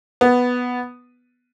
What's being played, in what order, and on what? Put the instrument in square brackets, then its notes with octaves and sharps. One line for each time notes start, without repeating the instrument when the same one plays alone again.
[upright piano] B3